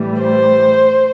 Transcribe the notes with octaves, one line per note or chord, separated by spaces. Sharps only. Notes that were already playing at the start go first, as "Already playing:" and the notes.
Already playing: A2 E3 G3
C5